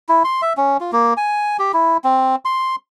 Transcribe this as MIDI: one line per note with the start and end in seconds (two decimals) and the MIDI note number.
0.09 0.23 64
0.24 0.41 84
0.42 0.53 76
0.57 0.77 61
0.80 0.91 65
0.92 1.14 58
1.17 1.57 80
1.59 1.72 67
1.73 1.97 64
2.04 2.36 60
2.45 2.76 84